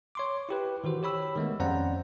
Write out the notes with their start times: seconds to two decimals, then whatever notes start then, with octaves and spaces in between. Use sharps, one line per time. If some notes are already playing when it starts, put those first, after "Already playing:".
0.15 C#5 C6 D6
0.49 E4 G4 B4
0.84 D#3 E3 F#4 C5
1.03 G4 C#5 B5 E6
1.36 D#3 G#3 A3 B3
1.60 F2 C#4 C5 D5 F#5 A#5